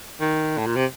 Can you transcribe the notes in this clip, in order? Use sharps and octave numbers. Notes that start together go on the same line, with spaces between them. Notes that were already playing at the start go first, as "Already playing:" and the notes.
D#3
A2
A#2
C3